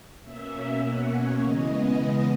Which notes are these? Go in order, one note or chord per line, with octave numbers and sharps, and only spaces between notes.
B2 A#3 C#4 E5
F#5
C#5
C#3 E3 G#3 B3 D#5
D#5
D#5